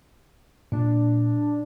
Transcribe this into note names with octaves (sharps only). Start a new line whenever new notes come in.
A#2 D4